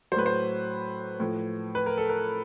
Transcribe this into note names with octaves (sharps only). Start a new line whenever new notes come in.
A2 F#3 B4 C5
C5
A2 F3
B4
A#4
A4
A#4